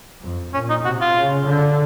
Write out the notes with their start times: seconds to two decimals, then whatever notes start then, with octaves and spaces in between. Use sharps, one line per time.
0.23 F2
0.54 A#2 C#4
0.70 D#4
0.85 C3 F#4
1.01 F4
1.16 C#3
1.47 D3